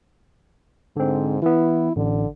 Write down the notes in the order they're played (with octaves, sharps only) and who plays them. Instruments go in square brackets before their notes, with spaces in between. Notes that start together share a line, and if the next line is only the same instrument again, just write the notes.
[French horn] G#2 [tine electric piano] D3 C4
[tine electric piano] E3 B3 [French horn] E4
[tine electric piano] A1 [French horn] D3